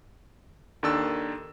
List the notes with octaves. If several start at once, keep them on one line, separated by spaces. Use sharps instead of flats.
D#2 D#3 D4 A4 E6